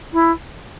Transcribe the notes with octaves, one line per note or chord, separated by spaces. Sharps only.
E4